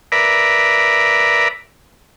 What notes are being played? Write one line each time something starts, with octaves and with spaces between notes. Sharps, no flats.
A#4 B4 D5 E5 A#5 B5